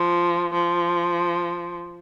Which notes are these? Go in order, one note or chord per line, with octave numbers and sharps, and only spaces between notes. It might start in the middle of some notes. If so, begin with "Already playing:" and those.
Already playing: F3
F3